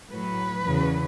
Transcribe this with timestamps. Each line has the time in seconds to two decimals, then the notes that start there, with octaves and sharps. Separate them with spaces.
0.11 A2 F#3 B4
0.64 E2 C#3 F#3